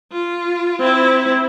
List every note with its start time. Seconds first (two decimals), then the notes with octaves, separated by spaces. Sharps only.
0.12 F4
0.79 C4 E4